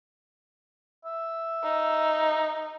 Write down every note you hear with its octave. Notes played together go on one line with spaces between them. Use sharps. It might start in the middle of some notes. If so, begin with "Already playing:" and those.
E5
D#4